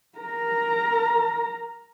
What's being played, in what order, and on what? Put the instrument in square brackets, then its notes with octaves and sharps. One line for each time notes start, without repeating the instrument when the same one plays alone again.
[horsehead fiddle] A#4 A#5